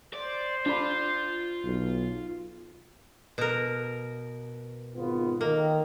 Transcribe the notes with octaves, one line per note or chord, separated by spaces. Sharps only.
C5 D5
D4 F4 B5
B1
B2 A#4
G#1 B3 F4
D#3 A#3